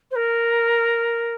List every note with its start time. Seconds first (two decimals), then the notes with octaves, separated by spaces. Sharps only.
0.11 C5
0.15 A#4